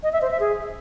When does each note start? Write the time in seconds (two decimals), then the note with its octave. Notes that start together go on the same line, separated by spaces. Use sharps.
0.03 D#5
0.12 E5
0.22 C5
0.31 E5
0.40 G#4